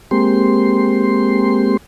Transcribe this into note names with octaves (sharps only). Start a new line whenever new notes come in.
G#3 A#3 C4 G4 C6